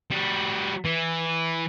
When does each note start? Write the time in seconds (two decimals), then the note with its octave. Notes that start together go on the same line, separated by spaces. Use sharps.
0.11 G3 F#4
0.85 E3